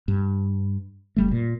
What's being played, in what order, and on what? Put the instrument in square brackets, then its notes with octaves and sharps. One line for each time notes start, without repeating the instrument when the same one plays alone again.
[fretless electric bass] G2
F#1 G3 A3
A#2